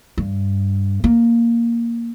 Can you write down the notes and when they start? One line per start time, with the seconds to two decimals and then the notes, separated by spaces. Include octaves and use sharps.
0.18 G2
1.04 A#3